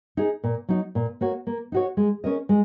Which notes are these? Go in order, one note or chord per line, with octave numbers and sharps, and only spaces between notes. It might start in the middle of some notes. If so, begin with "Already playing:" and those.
D#4 G#4
A#2
F#3 D#4
A#2
A#3 F#4 C#5
A#3
D#4 F#4 C#5
G#3
C#4 A#4 D#5
G#3